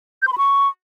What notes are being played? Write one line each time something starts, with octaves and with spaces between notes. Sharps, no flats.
G6
C6
B5
C#6